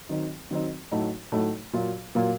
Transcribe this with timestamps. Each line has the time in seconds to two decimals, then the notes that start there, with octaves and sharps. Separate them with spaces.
0.09 D#3 F#3 C4 D#4
0.50 D#3 F#3 C4 D#4
0.91 A2 F#3 A3 D#4 F#4
1.32 A2 F#3 A3 D#4 F#4
1.73 A#2 F#3 A#3 F4
2.15 A#2 F#3 A#3 F4